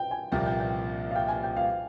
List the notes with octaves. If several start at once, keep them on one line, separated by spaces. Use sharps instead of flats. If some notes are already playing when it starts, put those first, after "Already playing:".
Already playing: G5
G#5
C2 A#2 F3 A#3 G5
G5
G5
F5
G5
G#5
G5
F5